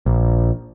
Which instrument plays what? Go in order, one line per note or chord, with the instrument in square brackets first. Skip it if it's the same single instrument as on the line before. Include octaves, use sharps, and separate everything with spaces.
[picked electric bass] A#1